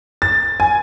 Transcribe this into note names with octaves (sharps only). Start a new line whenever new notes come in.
A6
G#5